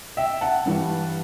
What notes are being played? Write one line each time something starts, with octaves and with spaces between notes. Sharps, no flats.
E5 G5
F#5 A5
G2 E3 G3